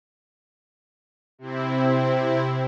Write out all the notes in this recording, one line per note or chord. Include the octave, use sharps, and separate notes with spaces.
C3 C4 E4